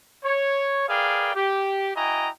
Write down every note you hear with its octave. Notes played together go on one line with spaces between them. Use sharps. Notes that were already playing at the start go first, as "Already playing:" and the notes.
C#5
G#4 A#4 B4 D5 F5 G5
G4
E4 F#4 D#5 G5 G#5 A#5